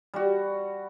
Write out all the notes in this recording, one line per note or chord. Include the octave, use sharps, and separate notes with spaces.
G3 F#4